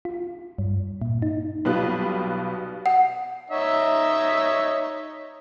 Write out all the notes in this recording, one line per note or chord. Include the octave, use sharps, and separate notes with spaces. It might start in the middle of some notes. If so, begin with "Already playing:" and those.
F4
G2
A#2
D#4
B1 B2 G3 F4 B4 F#6
F#5
D#4 C#5 E5